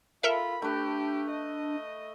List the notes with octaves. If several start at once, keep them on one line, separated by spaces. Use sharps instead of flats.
F4 A4 A#4 E5 B5
A3 D4 G4 B4
D#5